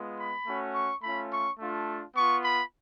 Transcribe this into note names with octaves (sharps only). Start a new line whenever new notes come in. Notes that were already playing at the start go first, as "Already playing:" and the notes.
Already playing: G#3 B3 F4
B5
A3 C#4 F#4
C#6
A3 C#4 F4 B5
C#6
A3 D4 F4
B3 F4 C#6
B5